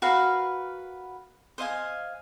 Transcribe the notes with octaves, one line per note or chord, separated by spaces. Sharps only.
F#4 A#4 B4 F5
C5 D#5 F5 G#5